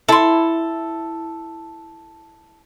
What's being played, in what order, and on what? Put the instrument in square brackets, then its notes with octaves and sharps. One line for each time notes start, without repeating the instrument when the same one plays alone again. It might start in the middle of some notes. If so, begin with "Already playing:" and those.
[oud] E4 [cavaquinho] A4 C6